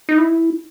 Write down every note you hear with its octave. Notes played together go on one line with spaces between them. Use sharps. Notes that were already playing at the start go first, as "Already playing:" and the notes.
D#4
E4